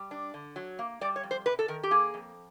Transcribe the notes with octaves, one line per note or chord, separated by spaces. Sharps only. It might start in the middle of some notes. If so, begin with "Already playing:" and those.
Already playing: G3
D4
D3
F#3
A#3
G3 D5
C#5
F2
C5
C3 B4
A4
D#3 A#4
G4
A#3 G#4
F2